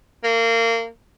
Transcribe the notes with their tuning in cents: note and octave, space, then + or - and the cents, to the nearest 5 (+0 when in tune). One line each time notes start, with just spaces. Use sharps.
A#3 -25